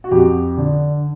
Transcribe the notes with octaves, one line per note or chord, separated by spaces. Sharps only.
F#4
F2 G4
D3 D4